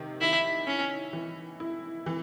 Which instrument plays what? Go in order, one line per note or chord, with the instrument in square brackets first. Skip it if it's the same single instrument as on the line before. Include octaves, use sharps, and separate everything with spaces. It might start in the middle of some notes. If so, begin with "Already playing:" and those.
Already playing: [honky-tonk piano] C3 D#3
[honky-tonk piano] D#3 [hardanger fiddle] E4
[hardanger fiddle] C#4 [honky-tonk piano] E4
[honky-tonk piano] E3
E4
E3